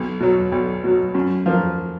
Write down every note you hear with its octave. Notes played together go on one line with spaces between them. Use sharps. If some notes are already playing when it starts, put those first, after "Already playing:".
Already playing: B1
B2 F#3
B1
B2 F#3
F#2
F3 A#3